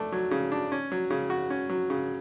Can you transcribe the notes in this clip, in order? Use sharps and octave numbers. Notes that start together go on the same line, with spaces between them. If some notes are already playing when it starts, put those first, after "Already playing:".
Already playing: A3 D4
F#3
C#3
D4
C#4
F#3
C#3
F#4
C#4
F#3
C#3